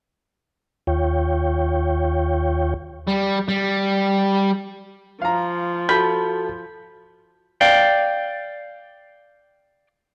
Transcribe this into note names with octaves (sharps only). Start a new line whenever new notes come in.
D#2 F4 C#5 G5
G3
G3
F3 F5 A#5
F#4 A4 A5 B5 G6
D5 F5 G5